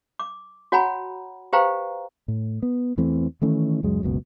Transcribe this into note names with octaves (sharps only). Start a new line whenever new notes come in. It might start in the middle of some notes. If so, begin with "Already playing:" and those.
D6
F#4 C#5 F#5 G#5 A#5 B5
G4 B4 C5 F5 G5 A#5
A2
B3
E2 E3 A3 C4
D#3 E3 A3 C#4
C#2 F#2 F#3 G#3
F#1 C#2 B2